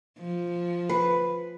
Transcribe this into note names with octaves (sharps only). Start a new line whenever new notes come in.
F3
B4